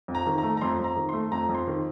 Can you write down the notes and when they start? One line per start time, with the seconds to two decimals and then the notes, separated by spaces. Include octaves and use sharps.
0.08 F2
0.15 A#5
0.27 D#3
0.38 A#5
0.43 A3
0.57 A#5
0.61 F2 C6
0.79 F2 A#5
0.97 D#3
1.09 C6
1.13 A3
1.31 F2 A#5
1.49 F2
1.55 C6
1.67 D#3